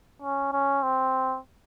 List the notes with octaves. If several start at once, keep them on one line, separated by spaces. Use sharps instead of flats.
C#4
C#4
C4